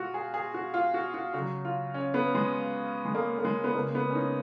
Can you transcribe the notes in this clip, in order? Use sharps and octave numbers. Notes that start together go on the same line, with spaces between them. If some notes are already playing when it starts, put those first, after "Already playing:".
Already playing: B2 G#3 F4 F#4
G#4
G#4
F#4
F4
F#4
F#4
C#3 F#3 F#4
F4
C#4
B3
G#3
G#3
A#3
A#3
G#3
B3
C#3 G#3 A#3
B3
C#4
D#4